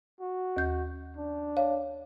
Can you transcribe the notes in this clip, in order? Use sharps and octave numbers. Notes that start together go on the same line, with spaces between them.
F#4
D#2 G6
D4
C#5 F5